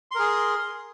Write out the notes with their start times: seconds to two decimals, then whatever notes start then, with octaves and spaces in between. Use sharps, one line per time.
0.11 C6
0.15 A#4
0.19 G#4